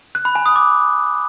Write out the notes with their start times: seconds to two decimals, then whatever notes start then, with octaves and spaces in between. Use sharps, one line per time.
0.15 F#6
0.25 B5
0.35 G#5
0.46 D#6
0.56 D6